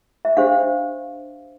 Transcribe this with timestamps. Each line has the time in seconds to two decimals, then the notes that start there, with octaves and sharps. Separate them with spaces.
0.25 E5
0.37 D4 G4 C5 F5